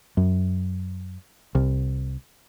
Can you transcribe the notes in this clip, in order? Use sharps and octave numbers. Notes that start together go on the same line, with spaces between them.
F#2
C2